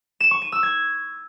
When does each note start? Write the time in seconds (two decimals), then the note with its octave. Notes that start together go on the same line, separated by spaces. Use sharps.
0.20 E7
0.31 C#6
0.42 D#7
0.52 E6
0.63 G#6